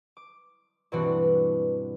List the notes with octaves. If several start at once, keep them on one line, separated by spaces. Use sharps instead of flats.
D6
G2 B2 E3 C4 D4 F#4